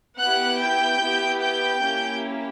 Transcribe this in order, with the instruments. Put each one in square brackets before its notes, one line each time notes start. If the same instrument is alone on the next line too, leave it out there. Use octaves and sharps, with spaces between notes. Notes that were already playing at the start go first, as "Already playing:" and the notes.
[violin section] B3 E4 G4 F#5 F#6
G5 G6
B3 E4 G4
G5 G6
A#3 C#4 E4 G4